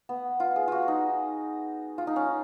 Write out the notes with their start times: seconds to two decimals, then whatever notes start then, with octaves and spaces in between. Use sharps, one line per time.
0.09 B3
0.40 F4
0.56 G#4
0.68 F4 F#4
0.88 D#4
1.98 F4
2.07 D#4
2.16 C#4